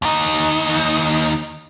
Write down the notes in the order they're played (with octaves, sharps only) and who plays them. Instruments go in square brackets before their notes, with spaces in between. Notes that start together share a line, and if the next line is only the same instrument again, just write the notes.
[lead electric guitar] D#2 D#4